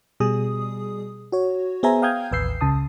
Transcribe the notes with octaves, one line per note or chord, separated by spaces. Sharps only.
B2 G3 G#4 D#6
F#4 C#5
B3 G#4 C5 E5 G#5 A#5
F5 G5 D#6 F6 G6 G#6
A1 D#2 B4 E6 G6 C7
C#2 C#3 A5 D#6